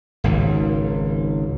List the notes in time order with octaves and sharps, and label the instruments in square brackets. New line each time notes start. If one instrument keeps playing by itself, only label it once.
[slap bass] G#1 C#2 G#2